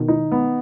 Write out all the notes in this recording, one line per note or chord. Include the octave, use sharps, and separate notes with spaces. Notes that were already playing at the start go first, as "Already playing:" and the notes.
Already playing: B2 D#3
D#4
B3